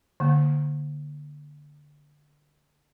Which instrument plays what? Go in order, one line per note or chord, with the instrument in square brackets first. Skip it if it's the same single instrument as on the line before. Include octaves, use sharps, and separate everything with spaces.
[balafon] D3 A#3